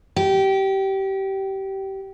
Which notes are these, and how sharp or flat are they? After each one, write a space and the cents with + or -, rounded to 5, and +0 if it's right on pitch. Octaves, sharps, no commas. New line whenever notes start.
G4 -20